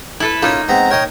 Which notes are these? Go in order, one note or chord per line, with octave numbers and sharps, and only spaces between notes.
E4 A4 B4
A#3 C#4 D#4 F4
G#3 B3 C4 A#5
A#4 C#5 D#5 G5